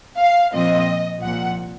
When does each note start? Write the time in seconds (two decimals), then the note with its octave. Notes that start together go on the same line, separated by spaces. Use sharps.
0.20 F5
0.54 A#2 F3 C4 D#5
1.22 C2 A#2 F3 F#5